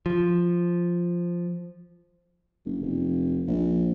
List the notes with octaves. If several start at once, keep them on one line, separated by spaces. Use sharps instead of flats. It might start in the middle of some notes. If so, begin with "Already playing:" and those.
F3
F#1
F1
A#1